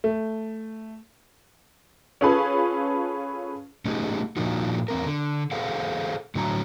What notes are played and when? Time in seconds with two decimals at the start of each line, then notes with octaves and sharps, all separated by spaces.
0.04 A3
2.21 C#4 F4 G#4 A4 B4
3.85 A3 C#4 D#4 F4 G4 G#4
4.37 A#2 F3 A#3 D4 D#4 F#4
4.88 E2 C4 A#4
5.06 D3
5.52 G#4 A4 C5 F5 F#5
6.35 A2 D3 F#3 A5 A#5